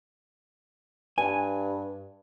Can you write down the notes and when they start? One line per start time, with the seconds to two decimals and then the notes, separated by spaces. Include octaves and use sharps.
1.18 G2 G#5